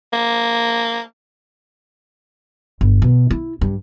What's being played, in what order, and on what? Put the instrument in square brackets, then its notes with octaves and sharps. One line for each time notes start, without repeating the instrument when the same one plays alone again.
[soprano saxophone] A#3
[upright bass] G1
B2
E4
G2